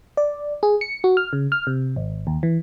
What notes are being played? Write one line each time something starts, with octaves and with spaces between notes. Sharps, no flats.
D5
G#4
C#7
F#4
F6
C#3
F6
C3
G#1
D#2
E3